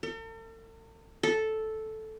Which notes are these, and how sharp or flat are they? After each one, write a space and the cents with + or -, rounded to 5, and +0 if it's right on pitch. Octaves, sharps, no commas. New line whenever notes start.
A4 +45
A4 -5